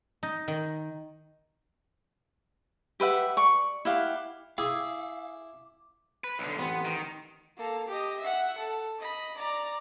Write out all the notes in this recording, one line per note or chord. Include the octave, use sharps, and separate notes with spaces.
D#4
D#3
G4 B4 E5 F#5
D5 C#6
E4 G4 F5 F#5
E4 G#4 E5 F5 B5 D6
B4
B1 D3
A1 B3 C4 G#5
D#3
A#3 A4
G4 D#5
E5 F#5
A4
D#5 B5
D5 A#5